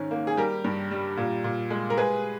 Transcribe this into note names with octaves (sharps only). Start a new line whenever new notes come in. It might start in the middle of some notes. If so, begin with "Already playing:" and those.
Already playing: G#2 D#3 C#4
A#3
G#4
G3 G4 A#4
G2
G3
A#2
A#2
G#3
A#4
G#3 G#4 B4